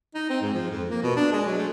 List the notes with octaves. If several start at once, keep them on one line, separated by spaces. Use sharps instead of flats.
D#4
C4
G#2
F3
F2
A#3
B2
D4
G#3
F#3
A3